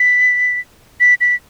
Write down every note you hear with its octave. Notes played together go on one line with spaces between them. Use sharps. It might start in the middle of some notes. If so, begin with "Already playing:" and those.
Already playing: B6
B6
B6